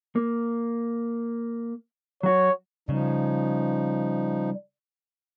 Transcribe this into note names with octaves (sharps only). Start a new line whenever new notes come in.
A#3
F#3 F#4 C#5
C#3 F3 G3 D#4